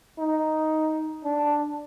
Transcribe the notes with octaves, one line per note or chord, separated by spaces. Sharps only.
D#4
D4